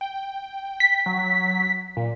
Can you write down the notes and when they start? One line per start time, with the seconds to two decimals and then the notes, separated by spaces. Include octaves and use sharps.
0.01 G5
0.80 B6
1.06 F#3
1.97 A#2